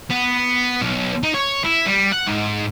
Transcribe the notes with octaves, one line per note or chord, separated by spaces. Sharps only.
B3
B1
D#4
C#5
E4
G3
F#5
G#2